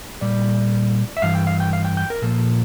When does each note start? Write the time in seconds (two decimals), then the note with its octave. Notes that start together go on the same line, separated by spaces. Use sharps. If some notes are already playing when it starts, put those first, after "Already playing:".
0.21 A#2 G3 D5
1.17 E5
1.22 G2 E3 F5
1.35 G5
1.47 F5
1.60 G5
1.73 F5
1.85 G5
1.97 G5
2.10 A#4
2.22 A#2 F3 A#3 A4